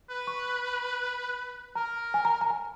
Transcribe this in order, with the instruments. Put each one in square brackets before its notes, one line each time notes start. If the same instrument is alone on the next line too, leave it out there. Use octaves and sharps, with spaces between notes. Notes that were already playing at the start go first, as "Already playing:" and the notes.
[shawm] B4
[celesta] C#6
[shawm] A#4 [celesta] A#5
[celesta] G#5
A#5
A#5
G#5